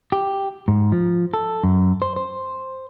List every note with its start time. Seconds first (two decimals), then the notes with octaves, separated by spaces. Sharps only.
0.12 G4
0.68 G#2
0.92 F3
1.34 A4
1.64 F#2
2.02 C5
2.16 C5